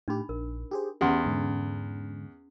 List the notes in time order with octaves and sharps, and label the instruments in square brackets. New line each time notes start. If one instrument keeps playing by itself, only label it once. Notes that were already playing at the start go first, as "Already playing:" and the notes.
[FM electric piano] A2 G4 [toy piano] D4 D#4 B5
[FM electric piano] A#1 [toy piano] A#4
[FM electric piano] G4 G#4 C5
[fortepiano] E2 [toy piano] C#4 F#5 C6 [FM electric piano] G4
[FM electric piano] G#2 D3